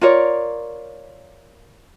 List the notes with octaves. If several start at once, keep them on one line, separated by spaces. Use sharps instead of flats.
F4 A#4 C#5 D5